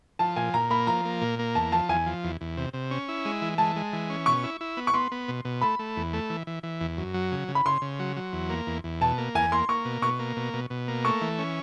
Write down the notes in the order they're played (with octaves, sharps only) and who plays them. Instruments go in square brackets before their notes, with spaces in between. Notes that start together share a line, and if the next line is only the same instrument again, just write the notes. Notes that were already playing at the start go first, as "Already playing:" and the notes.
[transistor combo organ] F3 [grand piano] A5
[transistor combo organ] A#2 [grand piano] G#5
[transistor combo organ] A#2 [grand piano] A#5
[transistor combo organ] A#3 [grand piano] B5
[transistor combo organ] F3 [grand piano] A#5
[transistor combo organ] A#3
A#2
A#3
[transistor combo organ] E2 [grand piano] A5
[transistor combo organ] F3 [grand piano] A5
[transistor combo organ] E2 [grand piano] G#5
[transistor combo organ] F3
E2
E2
C3
C3
C#4
E4
G#3
E3
[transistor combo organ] G#3 [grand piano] A5
[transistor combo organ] G#3
E3
C#4
[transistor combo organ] B2 [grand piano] C#6
[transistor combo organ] E4
E4
B3
[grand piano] C#6
[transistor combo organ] B3 [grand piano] C6
[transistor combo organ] B3
B2
B2
[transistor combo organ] A3 [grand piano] B5
[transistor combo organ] A3
E2
A3
E3
E3
E3
E2
F#2
F#3
C#3
C#3
[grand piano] B5
[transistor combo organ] C#3 [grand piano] C6
[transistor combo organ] C#3
F#3
F#3
E2
A#3
E2
E2
[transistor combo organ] B2 [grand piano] A5
[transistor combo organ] A#3
[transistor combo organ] E2 [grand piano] G#5
[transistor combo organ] A#3 [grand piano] C6
[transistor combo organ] A#3 [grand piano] C#6
[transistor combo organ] B2
[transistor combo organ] B2 [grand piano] C#6
[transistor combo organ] A#3
B2
B2
B2
A#3
[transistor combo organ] A3 [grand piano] C#6
[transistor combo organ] E3
C#4